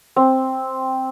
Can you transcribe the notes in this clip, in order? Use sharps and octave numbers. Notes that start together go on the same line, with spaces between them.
C4